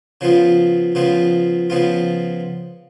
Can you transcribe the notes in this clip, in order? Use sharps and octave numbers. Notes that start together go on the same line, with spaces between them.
C#3 F3 B3 F4
C#3 F3 B3 F4
C#3 F3 B3 F4